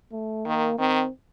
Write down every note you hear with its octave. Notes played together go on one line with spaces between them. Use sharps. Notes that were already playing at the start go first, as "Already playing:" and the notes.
A3
D#3 A#3
D#3 C4